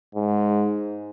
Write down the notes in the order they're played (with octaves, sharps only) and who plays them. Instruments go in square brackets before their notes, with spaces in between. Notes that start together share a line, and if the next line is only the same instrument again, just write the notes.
[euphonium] G#2